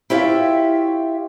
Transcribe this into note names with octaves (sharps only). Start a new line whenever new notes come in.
E4 F4 G4 C#5 E5 F5